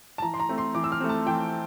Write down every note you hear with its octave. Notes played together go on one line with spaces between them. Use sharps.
A5
E3 A#5
C6
A#5
A3 C4
C6
E3 D6
E6
F6
A3 C4
A5
E3 G5